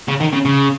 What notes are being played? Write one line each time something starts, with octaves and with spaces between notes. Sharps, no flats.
C#3
D#3
C#3
C#3